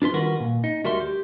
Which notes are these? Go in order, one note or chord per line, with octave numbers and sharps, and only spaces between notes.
D4 F4 B4 C6
D#3 G3 F4 F#4 A#4 B4
A#2
D#4
D2 G3 F#4 A#4 E5 C6
G4